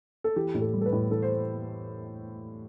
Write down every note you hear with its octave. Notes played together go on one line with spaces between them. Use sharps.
A4
E3 G4
A2
A4
G3
A4
B4
A2
E3 A4
C5